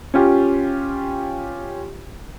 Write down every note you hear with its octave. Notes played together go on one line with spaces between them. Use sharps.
C#4 F4 G4